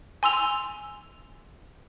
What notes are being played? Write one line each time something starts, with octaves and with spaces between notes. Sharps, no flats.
G#5 C6 E6 F7